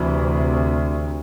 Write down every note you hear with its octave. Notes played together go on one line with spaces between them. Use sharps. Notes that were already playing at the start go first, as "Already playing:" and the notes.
Already playing: D2 C3 E3